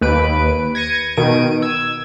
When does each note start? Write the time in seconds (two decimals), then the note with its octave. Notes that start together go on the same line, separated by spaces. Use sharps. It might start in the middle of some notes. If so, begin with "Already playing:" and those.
0.01 D#2 B4 D7
0.75 G#6 A#6 C#7 D#7
1.17 B2 D#3 D7 D#7
1.62 E6 G#6